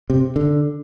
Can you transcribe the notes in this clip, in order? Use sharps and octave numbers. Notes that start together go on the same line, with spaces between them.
C3
D3